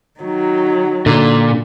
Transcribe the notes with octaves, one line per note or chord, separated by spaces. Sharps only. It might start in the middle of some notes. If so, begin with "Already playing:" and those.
D#3 F#3
A#2 D3